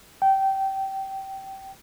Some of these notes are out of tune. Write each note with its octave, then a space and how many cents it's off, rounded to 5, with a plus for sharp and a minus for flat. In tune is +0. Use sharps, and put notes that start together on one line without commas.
G5 -20